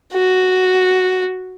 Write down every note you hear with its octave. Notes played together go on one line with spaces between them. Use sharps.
F#4